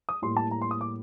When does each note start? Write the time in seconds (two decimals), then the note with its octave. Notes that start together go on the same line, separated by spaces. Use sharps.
0.09 D#6
0.22 A2 G3 A#3 C6
0.37 A5
0.51 A#5
0.62 C6
0.71 D#6
0.81 D6